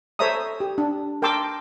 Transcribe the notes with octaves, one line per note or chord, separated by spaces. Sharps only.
A4 C5 C#5 E5 A#5 D#6
G4
D4
A#4 G5 A5 C6 D6 E6